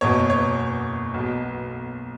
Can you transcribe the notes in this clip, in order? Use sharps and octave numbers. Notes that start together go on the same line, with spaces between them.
F#1 E2 B2 C#5
C#5
B1 B2